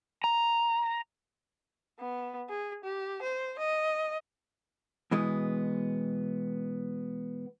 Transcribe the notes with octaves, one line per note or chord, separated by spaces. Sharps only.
A#5
B3
G#4
G4
C5
D#5
B2 E3 G#3 B3